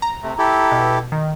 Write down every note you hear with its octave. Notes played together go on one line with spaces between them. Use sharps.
A#5
C3 A3
E4 G4 A4
B2
D#3